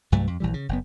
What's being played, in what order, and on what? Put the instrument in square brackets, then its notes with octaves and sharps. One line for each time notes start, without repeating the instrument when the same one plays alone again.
[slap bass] C2 G2 F#3 A3
F2
A#1 E3 G3
C#3
F#1 B3